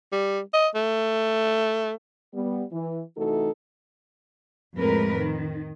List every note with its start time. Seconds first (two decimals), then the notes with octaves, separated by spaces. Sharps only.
0.12 G3
0.54 D#5
0.75 A3
2.35 G3 B3
2.73 E3
3.18 C3 E3 A3 D#4 F#4 A4
4.75 F2 A2 G#3 A#4 B4
5.16 D#3